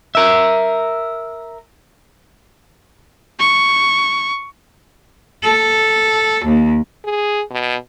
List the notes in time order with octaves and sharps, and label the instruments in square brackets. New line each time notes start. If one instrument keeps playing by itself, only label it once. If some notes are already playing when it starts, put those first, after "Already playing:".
[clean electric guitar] A#4 E5
[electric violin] C#6
[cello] A4
D#2
[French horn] G#4
B2